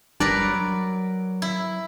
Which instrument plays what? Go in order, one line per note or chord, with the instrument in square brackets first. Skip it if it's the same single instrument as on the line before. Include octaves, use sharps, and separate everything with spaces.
[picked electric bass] F#1 G3 D4 [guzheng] A#4 B4 D5
[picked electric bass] F#3
[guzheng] E4